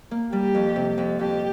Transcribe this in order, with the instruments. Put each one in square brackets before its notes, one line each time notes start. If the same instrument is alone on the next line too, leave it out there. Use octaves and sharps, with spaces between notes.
[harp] A#3
[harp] G3 [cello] G4
[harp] F2
C3
F2
[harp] F2 [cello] G4